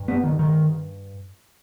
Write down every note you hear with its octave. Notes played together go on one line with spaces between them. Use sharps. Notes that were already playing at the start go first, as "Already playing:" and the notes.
Already playing: G2
B3
D#3
D#3